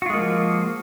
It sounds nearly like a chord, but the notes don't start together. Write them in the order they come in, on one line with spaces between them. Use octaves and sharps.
F#4 F4 G#3 A#3 F3